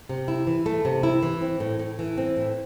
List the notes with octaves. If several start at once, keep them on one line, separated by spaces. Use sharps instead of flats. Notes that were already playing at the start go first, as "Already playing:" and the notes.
C3
E4
E3
A3
C3
E4
E3
C4
A2
A2
E3
C4
A2